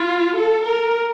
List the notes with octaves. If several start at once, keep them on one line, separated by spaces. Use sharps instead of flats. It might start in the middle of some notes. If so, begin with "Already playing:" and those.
Already playing: F4
A4
A#4